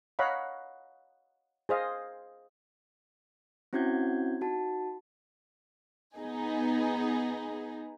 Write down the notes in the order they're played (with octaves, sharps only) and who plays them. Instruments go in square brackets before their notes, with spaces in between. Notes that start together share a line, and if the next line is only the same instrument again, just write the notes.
[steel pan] C#5 D#5 F5 F#5 A#5 B5
G#4 C5 D#5 F5
[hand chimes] C4 C#4 E4 F#4 G6 G#6
D#4 F#4 A5
[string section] B3 D#4 G#4